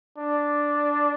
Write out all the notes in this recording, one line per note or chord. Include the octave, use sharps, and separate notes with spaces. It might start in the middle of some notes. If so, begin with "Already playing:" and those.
D4